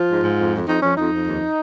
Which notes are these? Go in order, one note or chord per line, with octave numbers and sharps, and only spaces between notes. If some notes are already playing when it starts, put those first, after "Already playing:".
Already playing: F3 F4
G#2
G#2
F2
F2
F2 D#4
F2 C#4
F2 D#4
F2
D#2